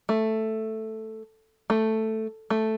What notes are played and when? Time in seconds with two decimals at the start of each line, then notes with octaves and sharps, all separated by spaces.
0.09 A3
1.70 A3
2.50 A3